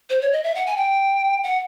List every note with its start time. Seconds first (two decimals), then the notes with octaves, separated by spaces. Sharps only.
0.10 C5
0.21 C#5
0.32 D#5
0.44 E5
0.55 F#5
0.67 G#5
0.77 G5
1.43 F#5